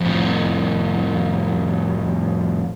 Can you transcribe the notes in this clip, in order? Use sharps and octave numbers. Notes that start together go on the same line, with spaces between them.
F2 A2